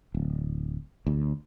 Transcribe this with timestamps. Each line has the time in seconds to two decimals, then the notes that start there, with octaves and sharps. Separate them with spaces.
0.15 D1
1.07 D2